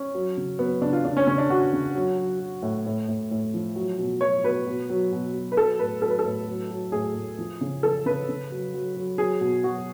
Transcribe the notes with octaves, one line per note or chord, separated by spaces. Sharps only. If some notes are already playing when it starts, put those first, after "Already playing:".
Already playing: C#4
F#3
C#3
F#3 B3
C#3 D4
F4
C#3 D4
C#4
C#3 C#4
D4
C#3 F#4
C#3
F#3
F#3
F#3
A2
A2
A2
A2
F3
F#3
B2
F#3 C#5
B2 B4
B2
F#3
B2
F#3
B4
F#3 A4
A2 B4
F#3 A4
B4
A4
A2
F#3
F#3
A2 G#4
A2
F3
C#3
F3 A4
C#3 B4
C#3
F#3
F#3
F#3
F#3 G#4
B2
F#3 F#4